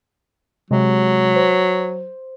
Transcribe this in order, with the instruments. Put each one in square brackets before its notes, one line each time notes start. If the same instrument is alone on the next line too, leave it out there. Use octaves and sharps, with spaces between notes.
[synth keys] C3 G#3 [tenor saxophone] F#3
[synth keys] C5